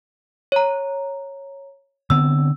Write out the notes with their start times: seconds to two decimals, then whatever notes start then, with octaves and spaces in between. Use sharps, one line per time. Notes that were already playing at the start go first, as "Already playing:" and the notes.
0.52 C#5 A#5
2.10 D3 B3 C4 E6